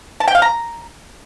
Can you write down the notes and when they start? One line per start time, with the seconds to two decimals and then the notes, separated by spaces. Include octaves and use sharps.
0.20 A5
0.28 G5
0.35 F5
0.42 A#5